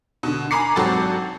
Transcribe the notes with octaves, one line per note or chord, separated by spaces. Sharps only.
B2 D3
G#5 A#5 B5 D6 C7
G#1 F#3 C4 F#4 A4 A6